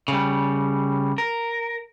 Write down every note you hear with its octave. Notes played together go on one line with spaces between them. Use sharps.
C#3 G3
A#4